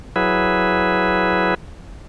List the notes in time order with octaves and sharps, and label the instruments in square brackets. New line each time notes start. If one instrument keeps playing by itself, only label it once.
[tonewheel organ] F#3 E4 G#4 B4